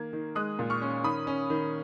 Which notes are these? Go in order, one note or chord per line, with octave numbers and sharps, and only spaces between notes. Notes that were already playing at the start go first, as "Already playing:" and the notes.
Already playing: D#3 A#3 G#6
D#3
G#3 D#6 F#6
A#2
C#6 F6
C#4
D#3 B5 D#6
C#4
D#3